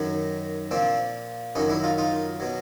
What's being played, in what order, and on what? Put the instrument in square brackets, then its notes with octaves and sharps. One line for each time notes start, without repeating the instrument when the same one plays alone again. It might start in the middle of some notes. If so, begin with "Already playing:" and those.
Already playing: [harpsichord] F#2 D#3 F#3
A#2 F3 C4 D4
F#2 D#3 F#3 C#4 D#4
D4 E4
D#4 F4
D#4 F4
B2 F#3